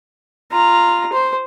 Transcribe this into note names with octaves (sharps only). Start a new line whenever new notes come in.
F4 A#5
C5